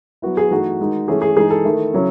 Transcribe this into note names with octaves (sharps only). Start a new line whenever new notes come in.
F#3 B3 E4 F#4
G#4
E3 A3 D#4 F#4
D#3 G#3 D#4
E3 A3 C#4 G#4
G#4
E3 G#3 D#4 G#4
A4
D#3 A3 E4
C#3 F#3 C#4 E4